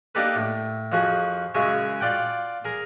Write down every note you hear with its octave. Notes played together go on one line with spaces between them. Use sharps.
A#3 D4 D#4 G4 A4 B4
A2
F2 F3 F#4 G#4
F#2 C#3 G#3 E5 G#5 C#6
F4 D5 F#5 G5
G#4 A#4